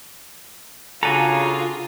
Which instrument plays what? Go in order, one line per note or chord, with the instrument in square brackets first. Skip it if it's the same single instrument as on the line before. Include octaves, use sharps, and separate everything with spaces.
[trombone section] C#3 [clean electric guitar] D4 F#4 A4 [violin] F4 [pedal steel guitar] G#5 A#5